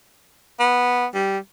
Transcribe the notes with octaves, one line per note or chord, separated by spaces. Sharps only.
B3
G3